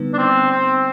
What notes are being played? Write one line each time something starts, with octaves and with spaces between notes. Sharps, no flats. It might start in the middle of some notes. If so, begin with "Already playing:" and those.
Already playing: D3 G3 B3 D#4 B4
D4
C4
C4